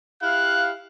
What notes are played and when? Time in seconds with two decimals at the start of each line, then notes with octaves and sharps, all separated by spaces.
0.23 E4 G4 F5 F#6